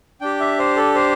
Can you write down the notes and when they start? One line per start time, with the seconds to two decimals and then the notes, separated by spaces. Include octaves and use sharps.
0.21 D4 G4 G5
0.40 E5
0.59 C5
0.77 A4
0.95 C5